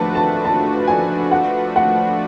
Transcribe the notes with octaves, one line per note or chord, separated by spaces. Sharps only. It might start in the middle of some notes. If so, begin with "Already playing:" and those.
Already playing: F3 A3 D4 F#4 B4 A5
A5
A5
G#5
F#5
F#5